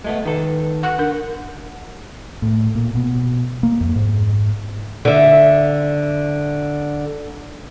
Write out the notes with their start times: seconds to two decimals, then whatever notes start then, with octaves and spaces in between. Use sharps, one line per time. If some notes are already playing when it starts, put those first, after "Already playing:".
0.04 G#3 A3 B3
0.25 D#3 A4 B4
0.83 F#5
0.98 D4 A#4
2.42 A2
2.75 A#2
2.95 B2
3.63 A#3
3.81 F2
3.96 G#2
5.05 D3 E5